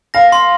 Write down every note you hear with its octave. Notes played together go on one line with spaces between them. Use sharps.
F5 A#6
C6